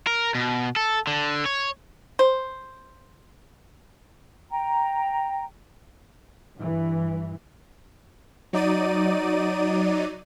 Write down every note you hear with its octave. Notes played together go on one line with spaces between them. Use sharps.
A#4
B2
A4
D3
C#5
C5
G5 A#5
G2 E3
F#3 D#4 D5 D#7